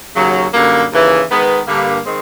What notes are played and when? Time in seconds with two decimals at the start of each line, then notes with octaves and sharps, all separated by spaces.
0.15 D#2 C#3 F#3
0.54 F#2 D3 G3 A#3
0.91 D#2 C#3 E3
1.30 D#3 G#3 B3
1.68 G2 D3 G3 A#3
2.06 D#3 G#3 C4